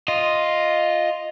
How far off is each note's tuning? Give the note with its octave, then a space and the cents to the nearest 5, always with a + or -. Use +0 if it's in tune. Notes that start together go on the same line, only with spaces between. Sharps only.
F4 +0 D#5 +0